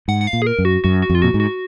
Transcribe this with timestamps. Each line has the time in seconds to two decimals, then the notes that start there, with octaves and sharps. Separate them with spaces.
0.08 G#2 F#5
0.21 F#5
0.27 F5
0.33 A#2
0.42 G#4
0.47 A#4
0.58 F#2
0.65 F#4
0.84 F#2 F#4
1.02 F#4
1.10 F2
1.15 F4
1.22 A#2 F#4
1.34 G#2
1.40 F#4